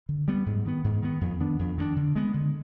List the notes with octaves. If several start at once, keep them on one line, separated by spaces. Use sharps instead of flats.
D3
G3 B3
G#2
D#3 B3
G#2
D#3 B3
F2
D#3 B3 D4
F2
D#3 B3 D4
D3
G#3 B3
D3